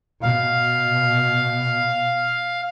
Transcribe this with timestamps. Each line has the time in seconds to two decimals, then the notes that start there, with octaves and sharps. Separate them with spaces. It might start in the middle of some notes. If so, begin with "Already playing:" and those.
0.23 B2 F5